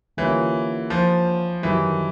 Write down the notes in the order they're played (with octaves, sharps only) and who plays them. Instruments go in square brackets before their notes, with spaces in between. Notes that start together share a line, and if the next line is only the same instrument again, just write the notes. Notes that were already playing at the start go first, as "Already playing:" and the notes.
[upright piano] D3 G3 A#3 C#4 F4 [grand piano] E3
[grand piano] F3
[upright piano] F#2 D#3 G3 [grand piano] E3